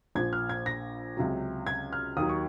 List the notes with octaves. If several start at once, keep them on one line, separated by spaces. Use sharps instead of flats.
A#1 A#2 F3 G#6
F6
G#6
A#6
C#2 C3 F#3
G#6
F6
D#2 D#3 F#3 D#6
C#6